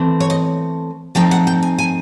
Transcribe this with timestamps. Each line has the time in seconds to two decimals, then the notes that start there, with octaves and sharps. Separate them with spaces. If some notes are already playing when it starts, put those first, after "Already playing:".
Already playing: E3 A3 C4
0.20 C#5
0.30 D#5
1.15 F3 A3 C4 D#4 G5
1.31 F#5
1.47 G5
1.63 G#5
1.78 G#5